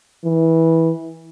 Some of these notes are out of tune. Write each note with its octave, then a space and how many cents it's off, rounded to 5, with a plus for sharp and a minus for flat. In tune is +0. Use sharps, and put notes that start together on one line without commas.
E3 -15